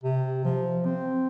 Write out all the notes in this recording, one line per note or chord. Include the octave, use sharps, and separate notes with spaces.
C3
F3
C4